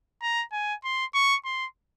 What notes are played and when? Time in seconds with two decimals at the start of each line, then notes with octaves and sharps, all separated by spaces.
0.22 A#5
0.53 G#5
0.84 C6
1.14 C#6
1.45 C6